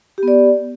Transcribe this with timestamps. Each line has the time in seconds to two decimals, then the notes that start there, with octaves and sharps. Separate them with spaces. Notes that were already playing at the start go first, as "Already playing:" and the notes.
0.18 G4
0.23 B3
0.28 D5